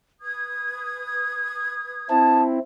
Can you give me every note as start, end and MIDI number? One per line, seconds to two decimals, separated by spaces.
0.21 2.41 71
0.21 2.41 87
0.21 2.41 92
2.10 2.59 60
2.10 2.59 64
2.10 2.43 81